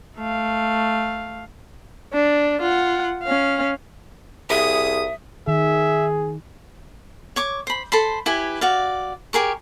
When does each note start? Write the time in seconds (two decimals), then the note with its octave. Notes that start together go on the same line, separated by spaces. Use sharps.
0.16 A3 F5
2.13 D4
2.62 F4 F#5
3.23 C#4 F5
4.50 C2 G#4 E5 D#6
5.48 D#3 G#4 E5
7.36 C#5 C#6 D6
7.67 C5 B5
7.92 A4 C5 B5 C6
8.26 E4 G4 B4 G#5
8.61 F#4 D5 F5
9.33 G4 G#4 A#4 C#6